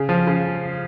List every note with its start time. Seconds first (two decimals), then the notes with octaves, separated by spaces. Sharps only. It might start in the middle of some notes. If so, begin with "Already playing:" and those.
Already playing: C#3
0.09 F3
0.27 C#3